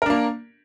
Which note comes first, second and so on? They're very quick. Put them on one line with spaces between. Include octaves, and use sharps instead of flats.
A#4 D4 A#3